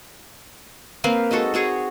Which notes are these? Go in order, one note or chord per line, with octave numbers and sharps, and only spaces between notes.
A#3 C4 B4 F5
G#3 D#4 F#4 A4
C4 F#4 G#4 C#5